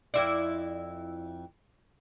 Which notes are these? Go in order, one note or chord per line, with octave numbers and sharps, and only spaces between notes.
F2 E4 D5